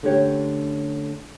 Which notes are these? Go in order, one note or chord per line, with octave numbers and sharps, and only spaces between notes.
D3 A3 C#4 G4 C#5